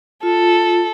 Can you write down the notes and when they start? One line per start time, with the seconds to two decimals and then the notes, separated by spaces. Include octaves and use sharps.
0.23 F4 A4